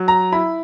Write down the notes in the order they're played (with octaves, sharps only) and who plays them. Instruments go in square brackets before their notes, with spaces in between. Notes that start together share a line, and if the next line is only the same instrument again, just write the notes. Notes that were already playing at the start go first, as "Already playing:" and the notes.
Already playing: [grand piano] F#3
A#5
E4 B5